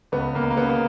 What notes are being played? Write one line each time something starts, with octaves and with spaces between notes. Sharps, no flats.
C#2 B3
C#2 A#3
A#3
C#3 B3
A#3